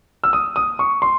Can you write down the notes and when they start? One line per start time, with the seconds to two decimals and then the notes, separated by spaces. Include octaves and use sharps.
0.24 E6
0.33 D#6
0.56 D#6
0.79 C#6
1.02 C6